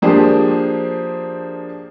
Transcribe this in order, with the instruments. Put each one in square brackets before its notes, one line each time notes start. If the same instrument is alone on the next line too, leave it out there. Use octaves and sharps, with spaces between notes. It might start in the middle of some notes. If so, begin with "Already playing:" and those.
[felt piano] F3 A#3 D4 G4 G#4 C5